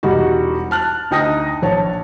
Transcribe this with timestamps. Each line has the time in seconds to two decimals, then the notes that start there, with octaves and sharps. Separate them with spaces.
0.03 E1 G3 D#4 F#4
0.71 A5 F6 F#6
1.11 D2 D#4 G5 D#6 A#6
1.62 A#1 C#5 A5